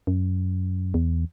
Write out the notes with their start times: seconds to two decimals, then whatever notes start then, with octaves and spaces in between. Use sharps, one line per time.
0.07 F#2
0.94 E2